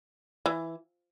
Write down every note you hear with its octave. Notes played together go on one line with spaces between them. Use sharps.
E3